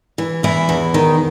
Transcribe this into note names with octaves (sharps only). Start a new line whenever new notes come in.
E3
E2 E3 E4
E2
D#3